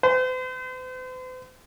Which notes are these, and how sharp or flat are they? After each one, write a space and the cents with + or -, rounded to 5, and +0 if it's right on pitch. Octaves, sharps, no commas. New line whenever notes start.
C5 -45